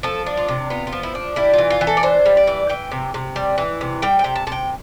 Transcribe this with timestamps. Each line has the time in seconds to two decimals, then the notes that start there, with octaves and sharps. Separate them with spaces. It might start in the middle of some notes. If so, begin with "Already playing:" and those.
0.03 F3 A4
0.26 D4
0.37 F4
0.48 C3
0.70 B3 F4
0.87 F4
0.92 F3
1.03 E4
1.15 D4
1.36 G3 E4
1.54 E3 F4
1.70 F4
1.81 E3
1.87 A4
1.97 D5
2.03 D4 C5
2.26 G3
2.37 D5
2.47 E3
2.70 E3 G5
2.92 C3
3.14 C3
3.36 G3
3.58 E3
3.81 C3
4.02 G3 G5
4.19 G5
4.24 C3
4.36 A5
4.47 C3 A5
4.52 G5